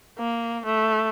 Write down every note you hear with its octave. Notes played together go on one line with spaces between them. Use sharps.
A#3
A3